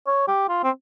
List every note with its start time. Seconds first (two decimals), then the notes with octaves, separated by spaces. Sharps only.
0.07 C#5
0.28 G4
0.49 F4
0.64 C4